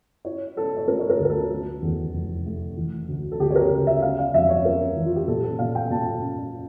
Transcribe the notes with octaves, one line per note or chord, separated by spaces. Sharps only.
E4 C#5
E4 A4
C#5
A3 A#4
C#5
A#4
D2
A#4
A4
A3 A4
E2
F1
A3
E3
D2
A4
D2 G4
C#5
A#4
C#3
E5
C#4 F5
F5
F2 E5
C#5
C#4 A#4
E3
F4
G4
A#2 A4
A4
A#2 F5
G5
A#2 A5
C#4